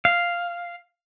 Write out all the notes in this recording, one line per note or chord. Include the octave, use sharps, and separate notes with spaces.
F5